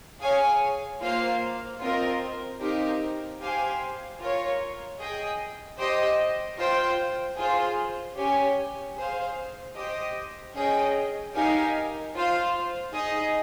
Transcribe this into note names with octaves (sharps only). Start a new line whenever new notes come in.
G#4 C#5 F5 G#5
A#3 F4 C5 F5
C4 F4 A#4 D#5
C4 D#4 G4 A#4 F5
G4 C5 F5 G#5
F4 A#4 C#5
G#4 D#5 G5
G4 C5 D#5 G5
F4 C5 G5
F4 G#4 C5
C#4 G4 C#5 G#5
G#4 C5 F5
G4 C5 D#5
C#4 G#4 D#5 G5
D#4 G4 A#4 F5 G#5
F4 C5 F5
D#4 G#4 D#5